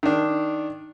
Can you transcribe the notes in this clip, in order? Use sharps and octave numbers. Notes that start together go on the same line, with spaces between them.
D#3 D4